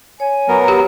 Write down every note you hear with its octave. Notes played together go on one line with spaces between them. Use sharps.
C#5 G#5
F#3 B3 A#4
G4